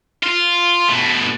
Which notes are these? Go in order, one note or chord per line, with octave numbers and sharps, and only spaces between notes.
F4
B2 A3